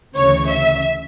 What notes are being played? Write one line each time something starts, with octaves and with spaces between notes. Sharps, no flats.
D2 C#3 E3 C#5
E5